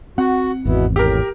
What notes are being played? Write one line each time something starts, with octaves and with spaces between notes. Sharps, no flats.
C4 F#4 F#5
G#1 E2 B2 B3 E4
A2 G4 A#4